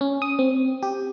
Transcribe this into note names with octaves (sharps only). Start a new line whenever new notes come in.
C#4
D#6
C4
G4